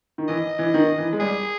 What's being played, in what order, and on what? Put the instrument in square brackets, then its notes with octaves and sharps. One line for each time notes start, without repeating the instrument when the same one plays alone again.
[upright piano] D#3
[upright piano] E3 [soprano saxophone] D#5
[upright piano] E3
D#3
E3
G#3
[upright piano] G3 [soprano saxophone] G#4